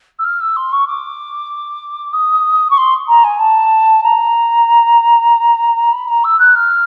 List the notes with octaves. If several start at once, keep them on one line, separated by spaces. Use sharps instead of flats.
E6
F6
E6
C6
C#6
D6
D#6
C#6
C6
A#5
G#5
A5
A#5
B5
A#5
E6
F#6
F6